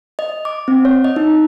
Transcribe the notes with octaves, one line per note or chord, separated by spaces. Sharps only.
D#5
D6
C4
C#5
D#5
D#4